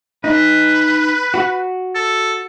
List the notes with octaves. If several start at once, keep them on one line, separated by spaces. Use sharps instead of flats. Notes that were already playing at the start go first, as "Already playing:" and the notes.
D#4 B4
F#4
A4